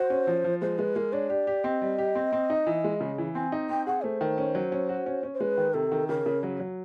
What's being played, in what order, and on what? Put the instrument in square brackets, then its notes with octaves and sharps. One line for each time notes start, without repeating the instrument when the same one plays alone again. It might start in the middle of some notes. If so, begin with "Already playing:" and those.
Already playing: [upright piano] F#4 [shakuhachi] C5
[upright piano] C#4
F3
F3
[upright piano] G#3 [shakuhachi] C5
[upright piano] G#3 [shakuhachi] B4
[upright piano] G#3 [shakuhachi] A#4
[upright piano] D4 [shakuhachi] C#5
[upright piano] G4 [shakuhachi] D5
[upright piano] G4
[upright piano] C4 [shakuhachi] D#5
[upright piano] G3
G4
C4
C4
D#4
E3
G#3
C#3
E3
[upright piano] C4 [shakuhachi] G#5
[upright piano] D#4
[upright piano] C4 [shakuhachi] G5
[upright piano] G#4 [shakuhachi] F#5
[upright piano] A3 [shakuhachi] C5
[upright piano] D#3
C#4
F#3
C#4
F#4
C#4
C#4
[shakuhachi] C5
[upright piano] G#3 [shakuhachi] B4
[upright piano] D#3
[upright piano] C3 [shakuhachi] A4
[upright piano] D#3
[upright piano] C#3 [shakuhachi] A#4
[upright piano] C#3
F#3
F#3